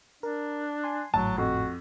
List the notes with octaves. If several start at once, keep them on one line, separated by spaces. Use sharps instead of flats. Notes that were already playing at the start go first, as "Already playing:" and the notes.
D4 A#4
G#5 C6
G#1 A2 F#3 A5
F2 F#4